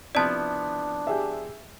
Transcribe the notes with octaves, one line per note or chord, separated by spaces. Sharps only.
C3 F3 B3 D4 E4 D5 A5
G4 G#4 E5